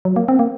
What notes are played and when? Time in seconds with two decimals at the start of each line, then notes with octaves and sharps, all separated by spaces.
0.05 F#3
0.16 A#3
0.28 C4
0.39 A#3